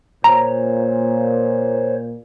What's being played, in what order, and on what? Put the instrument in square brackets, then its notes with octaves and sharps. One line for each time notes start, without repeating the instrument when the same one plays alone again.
[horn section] A#2 [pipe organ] C5 C#5 [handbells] A#5